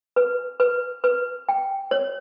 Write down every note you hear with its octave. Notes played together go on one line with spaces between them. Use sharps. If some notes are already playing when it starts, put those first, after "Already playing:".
B4
B4
B4
G5
C#5